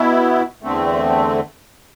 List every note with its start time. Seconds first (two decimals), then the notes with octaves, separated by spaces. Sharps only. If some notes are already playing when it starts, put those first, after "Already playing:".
Already playing: B2 B3 E4
0.62 E2 D3 A3 C4